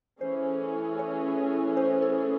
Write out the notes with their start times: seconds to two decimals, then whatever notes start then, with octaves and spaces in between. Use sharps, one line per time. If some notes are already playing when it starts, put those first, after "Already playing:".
0.21 E3 A3 C#4 G#4 C5
0.99 C#5
1.77 C5
2.02 A4